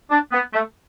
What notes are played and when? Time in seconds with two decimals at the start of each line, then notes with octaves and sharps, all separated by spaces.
0.11 D4
0.32 B3
0.54 A3